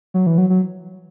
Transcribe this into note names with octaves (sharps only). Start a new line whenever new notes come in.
F#3
E3
F#3
F#3